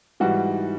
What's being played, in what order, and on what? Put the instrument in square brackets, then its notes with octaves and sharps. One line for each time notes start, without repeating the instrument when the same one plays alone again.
[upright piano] G#2 E3 G3 [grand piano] F#4